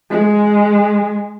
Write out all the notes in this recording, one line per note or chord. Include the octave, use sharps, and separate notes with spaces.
G#3